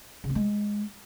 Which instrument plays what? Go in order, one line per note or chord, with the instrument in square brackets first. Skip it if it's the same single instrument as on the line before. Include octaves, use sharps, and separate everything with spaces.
[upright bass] C#3
C4
G#3